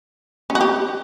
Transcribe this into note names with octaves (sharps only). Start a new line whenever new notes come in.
C#4
F#4
G4